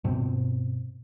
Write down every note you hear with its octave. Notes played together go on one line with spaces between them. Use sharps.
G2 B2 C4